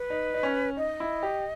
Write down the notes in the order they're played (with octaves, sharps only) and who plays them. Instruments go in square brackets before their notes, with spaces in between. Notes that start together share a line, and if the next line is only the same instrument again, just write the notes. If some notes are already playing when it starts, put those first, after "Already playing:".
Already playing: [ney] B4
[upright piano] D#4
D#4
C#4
[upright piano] D#4 [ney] D#5
[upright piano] E4
G4